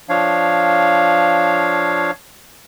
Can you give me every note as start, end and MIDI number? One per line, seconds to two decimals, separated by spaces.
0.09 2.11 53
0.09 2.11 62
0.09 2.11 73
0.09 2.11 77